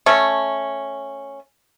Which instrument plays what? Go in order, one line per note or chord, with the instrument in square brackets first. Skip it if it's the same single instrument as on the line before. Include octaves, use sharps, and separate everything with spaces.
[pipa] A3 C#4